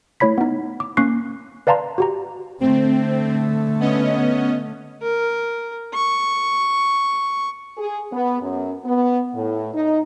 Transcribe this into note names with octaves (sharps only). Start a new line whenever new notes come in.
A3 E4 C#5 B5 B6
B3 D#4
D6
A#3 C#4 C#6 F#6 C7
B4 D5 F5 A5 A#5 C6
F#4 G4 A#5
D3 A3 C4
B3 C#4 D#5
A#4
C#6
G#4
B3
F#2
B3
A2
D#4